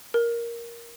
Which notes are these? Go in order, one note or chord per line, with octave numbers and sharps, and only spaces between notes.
A#4